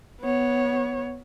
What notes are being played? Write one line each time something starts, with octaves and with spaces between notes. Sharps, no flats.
B3 C#5